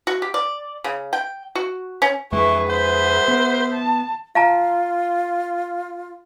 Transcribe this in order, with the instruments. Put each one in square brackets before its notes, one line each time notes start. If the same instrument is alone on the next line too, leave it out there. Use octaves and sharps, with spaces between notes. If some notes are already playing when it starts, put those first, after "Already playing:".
[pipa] F#4
G4
D5
C#3
G5
F#4
C#4
[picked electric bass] F2 G#3 [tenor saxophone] E3 [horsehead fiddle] G#4 B4 [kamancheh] C#6
[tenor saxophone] C5 [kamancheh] E5 F#5
[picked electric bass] B3
[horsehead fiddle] A5
[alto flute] F4 [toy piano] F5 A5 A#5